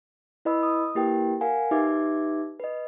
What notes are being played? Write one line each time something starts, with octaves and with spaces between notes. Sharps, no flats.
E4 B4 D#5 B5 E6
D#6
A#3 E4 G4 A#4 B4 G5
A#4 F5 F#5 G#5
D#4 G4 B4 E5 D6 G#6
B4 D#5